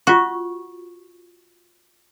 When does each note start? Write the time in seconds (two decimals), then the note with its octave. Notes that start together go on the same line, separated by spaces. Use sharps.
0.07 F4 F#4 C#6